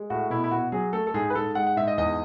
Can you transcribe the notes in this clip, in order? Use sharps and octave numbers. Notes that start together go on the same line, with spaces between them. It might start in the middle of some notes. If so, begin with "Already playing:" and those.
Already playing: G#3
A2 F#4
B2 E4
E4
B2 F#4
F#3 G#4
A3 A4
A4
G#2 G#4
B4
G#2 A4
G#3 F#5
F#5
G#2 E5
D#5
E2 D#5